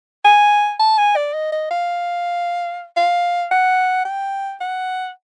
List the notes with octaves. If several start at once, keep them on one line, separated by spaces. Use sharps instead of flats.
G#5
A5
G#5
D5
D#5
D#5
F5
F5
F#5
G5
F#5